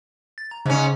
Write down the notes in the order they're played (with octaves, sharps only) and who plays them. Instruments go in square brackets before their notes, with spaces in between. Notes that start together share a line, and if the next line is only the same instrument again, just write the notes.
[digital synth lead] A6
A#5
[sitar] G#2 C#4 [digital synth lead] C#3